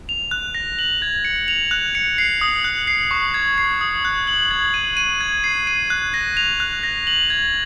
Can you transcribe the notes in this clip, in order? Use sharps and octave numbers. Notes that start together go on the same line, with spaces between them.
F7
F#6
A#6
F#7
G#6
C#7
F7
F#6
C#7
C7
D#6
F#6
C7
C#6
G#6
C7
D#6
F#6
F#7
G#6
D#7
D#7
G#6
C7
D#7
F#6
A#6
F7
F#6
A#6
F#7
G#6